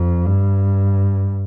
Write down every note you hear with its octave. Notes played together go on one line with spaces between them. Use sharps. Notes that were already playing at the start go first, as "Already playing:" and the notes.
Already playing: F2
G2